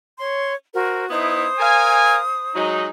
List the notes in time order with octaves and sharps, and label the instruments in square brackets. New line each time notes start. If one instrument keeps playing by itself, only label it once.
[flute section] C#5 C6
F#4 A#4 C5
[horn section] B3 D#4 E4 [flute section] C5 D#6
[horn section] A#4 F5 G#5
F#3 G#3 D#4